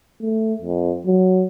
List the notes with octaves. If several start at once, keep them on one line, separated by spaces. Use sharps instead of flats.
A3
F2
F#3